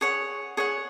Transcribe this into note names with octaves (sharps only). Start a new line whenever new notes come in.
G#4 C#5 F#5
G#4 C#5 F#5